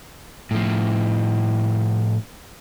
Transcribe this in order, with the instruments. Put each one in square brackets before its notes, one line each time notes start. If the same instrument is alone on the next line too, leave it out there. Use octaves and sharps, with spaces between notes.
[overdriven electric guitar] A2 F3